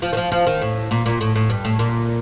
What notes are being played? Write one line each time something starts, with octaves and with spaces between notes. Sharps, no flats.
F3
D#3
F3
F3
D#3
A2
A#2
A#2
A2
A2
G2
A2
A#2